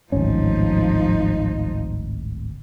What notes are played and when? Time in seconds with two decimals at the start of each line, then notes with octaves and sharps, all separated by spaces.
0.12 D1 G#1 F3 C#4 D#4